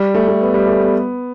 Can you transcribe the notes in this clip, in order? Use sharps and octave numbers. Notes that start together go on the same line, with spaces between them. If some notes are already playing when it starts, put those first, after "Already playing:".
Already playing: G3
A3
A3
B3
G3
A3
B3